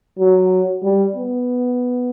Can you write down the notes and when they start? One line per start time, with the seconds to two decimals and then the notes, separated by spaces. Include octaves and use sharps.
0.19 F#3
0.83 G3
1.16 B3